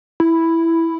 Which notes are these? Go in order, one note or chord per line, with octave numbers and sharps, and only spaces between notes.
E4